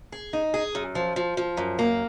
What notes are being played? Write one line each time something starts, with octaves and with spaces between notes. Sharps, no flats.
G#4
D#4
G#4
F#2
F3
F3
F3
F#2
A#3